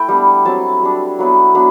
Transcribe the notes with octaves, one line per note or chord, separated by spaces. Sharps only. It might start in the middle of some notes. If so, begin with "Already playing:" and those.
Already playing: A3 E4 G5
G3 B3 D4
F#3 C4 E4 A5
G3 D4
F#3 B3 E4
F#3 B3 D4 B5